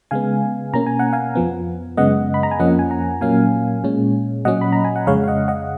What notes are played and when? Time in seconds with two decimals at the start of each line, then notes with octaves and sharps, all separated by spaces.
0.11 C#3 G#3 B3 F5 G#5
0.74 B2 A#3 C#4 A#5
0.86 G#5
0.99 F#5
1.13 F5 G#5
1.35 F2 F3 B3
1.97 F#2 C#3 G#3 B3 D#5 F#5
2.34 B5
2.43 A#5
2.51 G#5
2.59 F2 F3 A#3 C#4 D#5 F#5
2.79 G#5
2.90 F#5 A#5
3.21 A#2 F#3 A#3 C#4 F5 G#5
3.84 A#2 G#3 C#4
4.45 A#2 F#3 C#4 D#5 F#5
4.61 B5
4.72 A#5
4.85 G#5
4.96 F#5
5.07 F2 C#3 G#3 C#5 F5
5.23 F5
5.28 D#5 F#5
5.48 D#5 F#5